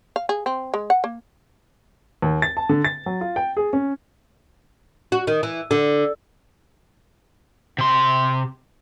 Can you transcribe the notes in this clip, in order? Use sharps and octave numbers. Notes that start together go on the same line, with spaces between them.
F5
G#4
C4
G#3
F#5
A#3
D#2
A6
A5
D3
A6
F#3
F4
G5
G#4
C#4
F#4
D#3
E3
D3
C3 C6